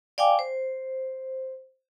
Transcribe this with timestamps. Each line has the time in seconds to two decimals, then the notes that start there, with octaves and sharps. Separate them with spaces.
0.18 D5 F5 G5 G#5 D6
0.39 C5